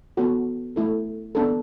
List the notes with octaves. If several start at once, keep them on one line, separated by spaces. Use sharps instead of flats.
B3 F#4 A4
A3 E4 A4
B3 D4 A4